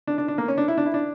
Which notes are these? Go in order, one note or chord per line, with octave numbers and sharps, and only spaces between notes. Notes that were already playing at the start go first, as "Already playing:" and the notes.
D4
D4
D4
A#3
C#4
D4
E4
D4
E4
D4